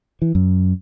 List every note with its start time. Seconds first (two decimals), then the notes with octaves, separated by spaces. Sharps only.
0.22 E3
0.35 F#2